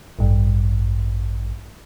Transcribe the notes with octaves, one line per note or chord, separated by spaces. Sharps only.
A1 G2